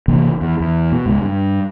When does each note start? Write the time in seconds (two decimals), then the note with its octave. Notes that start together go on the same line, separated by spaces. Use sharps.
0.08 G#1 C3 E3 A#3
0.41 E2
0.60 E2
0.92 B2
1.06 C#2 G#2
1.21 G2